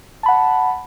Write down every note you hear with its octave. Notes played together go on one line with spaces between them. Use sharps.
F#5 A5 B5